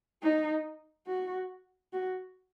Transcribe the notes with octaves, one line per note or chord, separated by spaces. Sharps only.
D#4
F#4
F#4